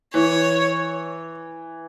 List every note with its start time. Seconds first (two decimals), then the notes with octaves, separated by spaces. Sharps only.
0.14 E3 C#5